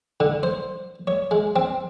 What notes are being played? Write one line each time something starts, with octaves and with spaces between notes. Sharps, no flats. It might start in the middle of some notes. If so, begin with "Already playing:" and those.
D3
C5
C#5
G#3
C4